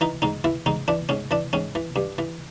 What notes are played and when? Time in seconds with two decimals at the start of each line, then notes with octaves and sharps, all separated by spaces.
0.01 E3 D#4
0.22 G#2 D#4
0.44 E3 E4
0.66 G#2 D#4
0.88 E3 D4
1.09 G#2 C#4
1.31 E3 D4
1.53 G#2 C#4
1.75 E3
1.96 G2
2.18 E3